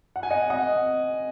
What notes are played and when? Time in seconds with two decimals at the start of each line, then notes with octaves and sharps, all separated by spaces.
0.16 F#5
0.23 G#5
0.30 D#5 F#5
0.50 D#5 F#5